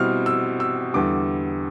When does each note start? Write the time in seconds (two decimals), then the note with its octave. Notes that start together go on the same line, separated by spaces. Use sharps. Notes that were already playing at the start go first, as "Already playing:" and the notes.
Already playing: B2 G3 C4 E4 F6
0.26 E6
0.60 E6
0.94 E2 D3 G3 D6